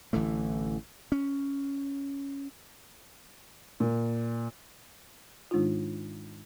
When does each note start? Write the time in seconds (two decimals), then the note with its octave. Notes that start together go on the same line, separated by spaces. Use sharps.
0.13 A1 D3 E3 A3
1.12 C#4
3.80 A#2
5.51 G#2 D#3 G#3 D4 D#4 F4